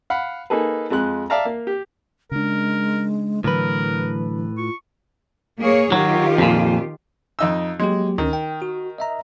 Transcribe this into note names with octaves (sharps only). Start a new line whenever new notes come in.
F5 F#5 B5
A#3 D#4 G#4 A4 B4
F2 G#3 F#6
D5 E5 F5 A5 A#5
A#3
G4
C#3 G#3 D4 A#4
A2 D3 E3 F#3 A#4 B4
F4 C#6
A#3 G#4 C#5
D#3 F#3 F4 G4
F2 A#2
F2 D#4 E6
F#3 G#3 A#3 G4
D2 D#3 C#4
G5
F#4
D#5 E5 A#5